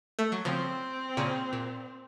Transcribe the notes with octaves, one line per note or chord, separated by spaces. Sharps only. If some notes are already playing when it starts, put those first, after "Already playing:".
A3
F#3
C#3 F3 C4
A#2 C#3
A#2